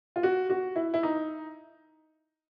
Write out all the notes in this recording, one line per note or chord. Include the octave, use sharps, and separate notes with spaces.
F4
F#4
F#4
E4
E4
D#4